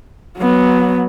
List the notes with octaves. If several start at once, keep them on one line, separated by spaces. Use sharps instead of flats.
F#3 B3